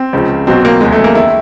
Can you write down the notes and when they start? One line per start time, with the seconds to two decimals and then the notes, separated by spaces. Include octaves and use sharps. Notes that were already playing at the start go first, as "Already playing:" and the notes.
Already playing: C4
0.13 C#2 C#3 F3
0.47 B1 B2 F#3 C4
0.65 A#3
0.81 E2 C#3 F#3 G#3
0.92 A3
1.04 A#3
1.15 D#3 E4